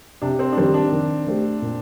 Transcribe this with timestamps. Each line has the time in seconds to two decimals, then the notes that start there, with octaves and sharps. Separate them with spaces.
0.22 C3 D4
0.39 C4
0.52 D4
0.57 D#3 G3 C4
0.74 D4
0.92 D#3
1.27 A3 C4 G4
1.62 A#2